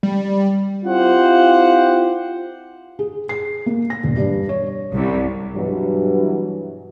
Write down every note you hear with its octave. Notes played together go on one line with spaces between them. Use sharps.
G3
C4 E4 F4 G4 C5 F#5
G#4
C7
A#3
A#6
E1
G2
C#5
C2
G2 B2 E3 F#3